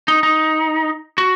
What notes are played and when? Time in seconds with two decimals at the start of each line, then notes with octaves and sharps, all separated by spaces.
0.08 D#4
0.23 D#4
1.18 F#4